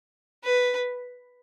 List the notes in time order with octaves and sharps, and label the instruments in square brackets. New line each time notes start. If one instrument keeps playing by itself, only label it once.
[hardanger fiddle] B4